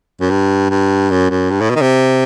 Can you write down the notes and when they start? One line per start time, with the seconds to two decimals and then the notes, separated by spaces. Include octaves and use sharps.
0.21 F#2
0.30 G2
0.70 G2
1.11 F#2
1.30 F#2
1.51 G2
1.61 A2
1.70 B2
1.75 D#3
1.81 C3